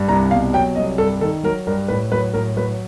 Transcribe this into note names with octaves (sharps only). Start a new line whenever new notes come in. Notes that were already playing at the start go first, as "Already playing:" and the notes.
Already playing: G2
C2 A#5
B2 F5
F#3 G5
C2 D#5
G2 A4
D#3 A4
F#3 A#4
G2 A#4
A2 B4
F#3 B4
A2 A#4
F#3 B4